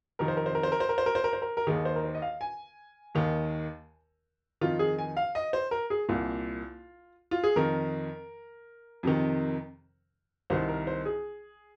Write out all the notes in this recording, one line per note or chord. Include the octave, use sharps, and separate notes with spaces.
F2 C3 D#3 A#4
C5
A#4
C5
A#4
C5
A#4
C5
A#4
C5
A#4
C5
A#4
C5
A#4
A#4
D#2 D#3 G#4
C5
A#4
C5
D#5
F5
G#5
D#2 D#3
F2 D#3 F4
G#4
G#5
F5
D#5
C5
A#4
G#4
C2 A#2 F4
F4
G#4
F2 D#3 A#4
F2 C3 D#3
C2 C3 D#3 C5
A#4
C5
G#4